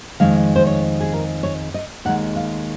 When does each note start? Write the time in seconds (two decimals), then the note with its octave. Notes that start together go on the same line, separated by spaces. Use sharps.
0.20 F2 D#3 G#3 F5
0.56 C5
0.67 C#5
1.00 G#4
1.13 A#4
1.43 C#5
1.74 D#5
2.05 D#2 D#3 G#3 F#5
2.36 F5